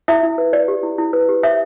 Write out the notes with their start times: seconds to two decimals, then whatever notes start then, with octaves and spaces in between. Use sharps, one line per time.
0.08 E4 E5
0.23 E4
0.38 B4
0.53 B4 D5
0.68 G4
0.83 E4
0.98 E4
1.13 B4
1.29 G4
1.43 C5 E5